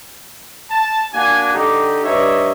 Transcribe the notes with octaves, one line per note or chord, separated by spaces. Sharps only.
A5
A#3 D4 F#4 G#5
D3 D#4 G4
G2 D#4 C#5 D#5 E5